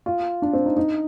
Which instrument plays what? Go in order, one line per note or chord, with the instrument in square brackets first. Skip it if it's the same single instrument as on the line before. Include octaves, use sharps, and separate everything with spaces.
[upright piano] F4
D4
C4
D#4
D#4